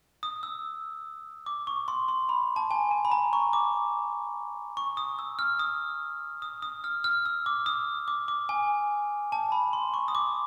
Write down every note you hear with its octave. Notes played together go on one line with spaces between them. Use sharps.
D#6
E6
D6
C#6
C6
C6
B5
A5
G#5
A5
B5
A#5
C#6
D6
C#6
D#6
E6
F6
D#6
D#6
D#6
F6
F6
E6
D6
D#6
D6
D6
G#5
A5
B5
C6
C#6
D#6
D6